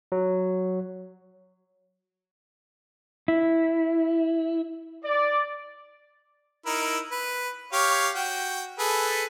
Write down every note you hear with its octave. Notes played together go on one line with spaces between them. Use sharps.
F#3
E4
D5
D#4 E4 A#4
B4
G4 C#5 F5
F#4 G5
G#4 A4 B4